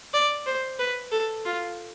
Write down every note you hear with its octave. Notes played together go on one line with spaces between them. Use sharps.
D5
C5
B4
A4
F4